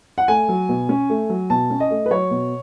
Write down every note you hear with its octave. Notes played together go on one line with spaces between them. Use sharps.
F#5
A3 G#5
F#3
B2
C#4
A3
F#3
B2 A5
C#4
D#5
A3
B4
F#3 C#5
B2